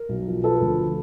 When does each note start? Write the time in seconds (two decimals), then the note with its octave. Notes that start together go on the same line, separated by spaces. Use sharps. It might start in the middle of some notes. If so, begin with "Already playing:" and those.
Already playing: A#4
0.09 B1
0.27 F3
0.44 F3 A4 B4
0.61 D2